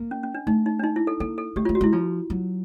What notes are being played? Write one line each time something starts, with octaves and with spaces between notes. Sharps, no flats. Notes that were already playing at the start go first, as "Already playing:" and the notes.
Already playing: A#3
C#4
C#4
D4
A3 D#4
D#4
D4
D#4
E4
A4
A#3 A4
A4
A3 G4
F4
A3
F#4
G#3 E4
F3 F4
F#3